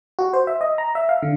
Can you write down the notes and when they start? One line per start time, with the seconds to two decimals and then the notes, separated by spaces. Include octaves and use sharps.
0.19 F#4
0.34 C5
0.47 E5
0.61 D#5
0.78 A#5
0.95 E5
1.09 F5
1.23 D3